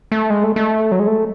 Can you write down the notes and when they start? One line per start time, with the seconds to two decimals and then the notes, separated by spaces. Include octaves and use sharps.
0.12 A3
0.30 G#3
0.44 A3
0.56 A3
0.92 F#3
0.99 G#3
1.07 A3